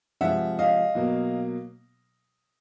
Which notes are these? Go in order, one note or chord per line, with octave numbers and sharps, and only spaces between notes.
C3 F3 G#3 E5 F#5
D#5 F5
B2 F#3 A#3